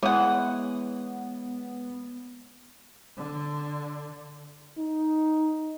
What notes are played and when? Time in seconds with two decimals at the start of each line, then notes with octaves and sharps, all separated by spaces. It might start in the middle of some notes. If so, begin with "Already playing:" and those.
0.03 E3 G#3 B3 C#5 F#5 D#6
3.17 D3
4.78 D#4